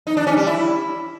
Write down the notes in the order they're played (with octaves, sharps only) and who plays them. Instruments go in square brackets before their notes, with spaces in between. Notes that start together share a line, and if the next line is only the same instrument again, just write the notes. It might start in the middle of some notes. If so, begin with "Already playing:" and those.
[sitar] D#4
D4
C#4
G3
E4